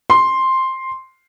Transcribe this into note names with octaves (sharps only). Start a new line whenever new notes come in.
C6